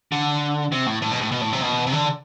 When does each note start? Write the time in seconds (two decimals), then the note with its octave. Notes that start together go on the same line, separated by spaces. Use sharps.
0.12 D3
0.72 C3
0.87 A2
1.02 A2
1.11 B2
1.21 A2
1.32 B2
1.41 A2
1.53 C3
1.62 B2
1.87 C3
1.92 D3